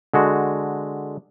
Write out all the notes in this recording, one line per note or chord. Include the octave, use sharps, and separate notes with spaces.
D3 G#3 F#4